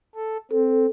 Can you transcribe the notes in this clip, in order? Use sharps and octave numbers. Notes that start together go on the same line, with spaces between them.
A4
C4 A4